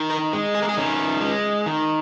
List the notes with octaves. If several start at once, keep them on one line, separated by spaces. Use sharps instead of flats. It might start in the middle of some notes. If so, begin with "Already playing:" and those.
Already playing: D#3
A#4
G#3
G#4
A#4
G#4
D#3 C#4
G#3
D#3